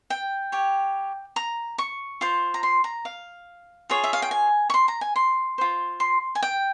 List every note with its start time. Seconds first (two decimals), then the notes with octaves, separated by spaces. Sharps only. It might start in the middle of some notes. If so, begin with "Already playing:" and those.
0.10 G5
0.52 G4 C#5
1.36 A#5
1.78 C#6
2.21 F4 C5
2.54 A#5
2.63 C6
2.84 A#5
3.05 F5
3.90 F4 G#4 C#5
4.04 E5
4.13 F5
4.22 G5
4.31 G#5
4.70 C#6
4.74 C6
4.88 A#5
5.01 G#5
5.16 C6
5.58 F4 C5
6.00 C6
6.35 G#5
6.42 G5